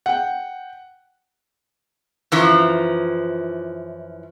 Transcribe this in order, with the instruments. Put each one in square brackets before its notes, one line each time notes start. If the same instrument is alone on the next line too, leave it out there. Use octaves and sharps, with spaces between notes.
[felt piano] F#5 G5
[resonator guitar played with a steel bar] F#2 E3 F3